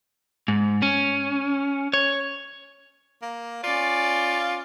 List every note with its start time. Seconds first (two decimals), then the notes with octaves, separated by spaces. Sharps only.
0.48 G#2
0.82 C#4
1.93 C#5
3.22 A#3
3.64 C#4 F4 D5